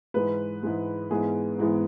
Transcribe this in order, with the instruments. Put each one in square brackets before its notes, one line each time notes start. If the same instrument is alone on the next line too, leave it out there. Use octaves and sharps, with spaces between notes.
[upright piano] G#2 E3 G#3 B4
G#2 E3 G#3
G#2 E3 G#3 B3 G#4
G#2 E3 G#3 B3